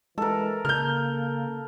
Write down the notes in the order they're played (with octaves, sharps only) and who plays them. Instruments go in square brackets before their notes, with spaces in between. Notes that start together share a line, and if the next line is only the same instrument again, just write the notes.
[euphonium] E3 [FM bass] G#3 [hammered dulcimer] A4 A#4
[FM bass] C#3 [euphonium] A#3 [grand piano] F6 G6